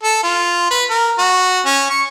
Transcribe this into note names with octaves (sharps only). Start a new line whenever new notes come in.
A4
F4
B4
A#4
F#4
C#4
C#6